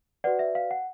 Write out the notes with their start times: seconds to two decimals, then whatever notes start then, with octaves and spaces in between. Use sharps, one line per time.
0.24 F#4 B4 D5 F#5
0.39 E5
0.55 F5
0.71 F#5